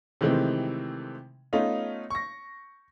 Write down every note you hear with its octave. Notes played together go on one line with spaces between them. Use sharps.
C3 D#3 E3 G#3 A3 C4
A3 B3 C#4 D#4 F4
C#6 A#6